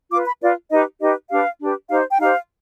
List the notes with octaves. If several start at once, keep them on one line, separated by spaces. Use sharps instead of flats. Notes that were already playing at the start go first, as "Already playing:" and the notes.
F4 B4 D6
B5
F4 B4 D5
D#4 G4 B4 D#5
D#4 G4 B4 D#5
D4 G4 B4 F5
D4 G4 B4
D#4 G4 C5 F5
G5
D#4 G4 C5 F5